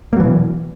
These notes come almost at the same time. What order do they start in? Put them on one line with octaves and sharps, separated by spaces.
A#3 F#3 E3 B2